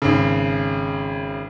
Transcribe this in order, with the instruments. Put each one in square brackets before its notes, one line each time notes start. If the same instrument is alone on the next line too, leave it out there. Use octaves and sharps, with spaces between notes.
[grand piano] G#1 C#3